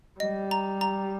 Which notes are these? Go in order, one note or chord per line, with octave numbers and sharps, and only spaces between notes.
G3 D#5
A#5
A#5